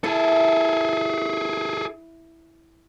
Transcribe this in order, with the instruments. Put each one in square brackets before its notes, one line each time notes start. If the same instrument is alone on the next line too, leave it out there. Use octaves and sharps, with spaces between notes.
[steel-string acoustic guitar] E4 [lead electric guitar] G#4 A4